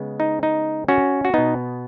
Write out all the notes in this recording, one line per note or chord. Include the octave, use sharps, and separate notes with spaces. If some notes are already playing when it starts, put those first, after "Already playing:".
Already playing: C#3 G#3 B3
D#4
D#4
C#4 F#4
F#4
B2 B3 D#4